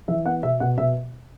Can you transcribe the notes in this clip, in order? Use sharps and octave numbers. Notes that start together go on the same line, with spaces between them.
E3 E5
B3 F#5
B2 E5
B2 F#5
B2 E5